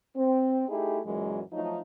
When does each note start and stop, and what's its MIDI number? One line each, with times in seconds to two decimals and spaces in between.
0.16 0.64 60
0.69 1.00 57
0.69 1.00 63
0.69 1.00 64
0.69 1.00 67
0.69 1.00 68
1.06 1.42 42
1.06 1.42 46
1.06 1.42 52
1.06 1.42 54
1.06 1.42 56
1.53 1.79 53
1.53 1.79 54
1.53 1.79 57
1.53 1.79 63